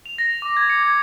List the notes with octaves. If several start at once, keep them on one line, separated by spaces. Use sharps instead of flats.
F7
A#6
D6
G#6
C#7
G#6